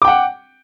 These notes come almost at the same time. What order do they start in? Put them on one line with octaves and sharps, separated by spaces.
D6 G5 F#5